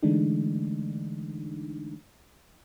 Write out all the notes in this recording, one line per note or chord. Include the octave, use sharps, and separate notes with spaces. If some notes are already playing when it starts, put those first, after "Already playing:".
D3 E3 G#3 A3 D4 D#4